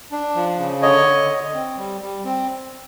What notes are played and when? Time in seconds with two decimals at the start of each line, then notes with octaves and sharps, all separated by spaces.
0.12 D4
0.35 F3
0.59 C#3
0.82 D3 C#5 D#5
1.06 D3
1.30 D3
1.54 C4
1.77 G3
2.01 G3
2.25 C4